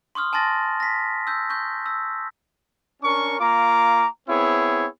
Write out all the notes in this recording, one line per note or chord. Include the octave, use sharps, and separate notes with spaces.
C6 C#6 D#6 F6
G#5 A5 C6 A6 A#6
A#6 B6
E6 G6
C#6 G6
E6
C#4 D4 A#4 C#6
A#3 F4 A#5 D6
B3 C4 E4 G#4 C#5